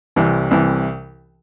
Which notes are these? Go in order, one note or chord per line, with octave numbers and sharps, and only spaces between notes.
C2 C3 E3
C2 C3 E3